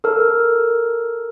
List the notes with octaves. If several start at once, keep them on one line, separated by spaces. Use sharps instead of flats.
A4 A#4